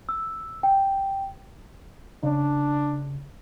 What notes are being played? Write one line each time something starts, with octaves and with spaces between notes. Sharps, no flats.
E6
G5
C#3 D4